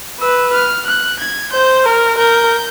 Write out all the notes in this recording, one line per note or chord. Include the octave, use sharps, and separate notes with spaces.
B4 E6
F6
F#6
G#6
C5 G6
A#4 F6
A#4 G6